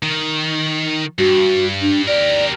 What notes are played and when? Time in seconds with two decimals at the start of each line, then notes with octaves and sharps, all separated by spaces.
0.03 D#3
1.19 G2 F#4
1.82 D4
2.08 G4 A#4 D5